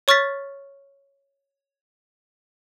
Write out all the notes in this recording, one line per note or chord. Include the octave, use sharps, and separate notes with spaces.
C#5 C#6 F6 A6 B6